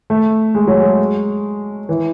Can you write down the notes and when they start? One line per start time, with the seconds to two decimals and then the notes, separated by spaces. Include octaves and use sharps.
0.10 A3
0.55 G#3
0.68 F#3
0.80 G#3
1.89 E3